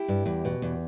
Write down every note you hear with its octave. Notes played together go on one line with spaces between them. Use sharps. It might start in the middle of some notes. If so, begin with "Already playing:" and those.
Already playing: E4 G4
G2
E2
B2
E2